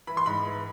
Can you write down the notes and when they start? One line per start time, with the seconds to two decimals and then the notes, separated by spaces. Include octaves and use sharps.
0.07 E3 B5
0.17 C6
0.26 G#2 B5
0.46 E3